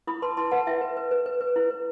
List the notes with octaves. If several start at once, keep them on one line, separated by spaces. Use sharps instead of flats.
E4 B5 D#6
B4 A5 C6
E4 A5 C6
B4 F#5 A5
E4 E5 G5
B4
B4
B4
B4
B4
E4
B4